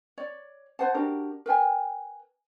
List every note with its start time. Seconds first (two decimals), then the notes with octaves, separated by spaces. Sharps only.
0.18 C#5 D5
0.79 B4 C5 F#5 A5
0.94 D4 F#4 G4 A#4
1.46 A#4 B4 G5 G#5